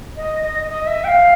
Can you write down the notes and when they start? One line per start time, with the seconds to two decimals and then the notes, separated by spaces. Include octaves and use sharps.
0.16 D#5
0.42 D#5
0.68 D#5
0.86 E5
1.04 G5
1.07 F5